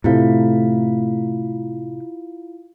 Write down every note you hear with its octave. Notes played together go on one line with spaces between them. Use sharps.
A2 C3 A3 E4 F4 F5